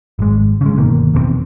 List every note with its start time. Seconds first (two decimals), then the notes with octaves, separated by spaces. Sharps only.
0.19 G#1 G#3
0.61 C#3 F3 G#3
0.77 G1 B2 D#3 A#3
1.14 E2 B2 A3 C4